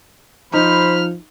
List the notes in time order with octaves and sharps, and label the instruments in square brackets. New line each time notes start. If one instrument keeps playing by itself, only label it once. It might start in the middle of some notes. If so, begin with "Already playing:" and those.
[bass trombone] F3 [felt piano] D#4 [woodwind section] C5 B5 [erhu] F6